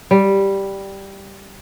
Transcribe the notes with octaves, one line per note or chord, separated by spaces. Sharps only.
G3